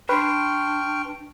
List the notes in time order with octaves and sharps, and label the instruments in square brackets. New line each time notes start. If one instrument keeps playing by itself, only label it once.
[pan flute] D4 [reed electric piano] B4 C6 [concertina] G5 C#6 F6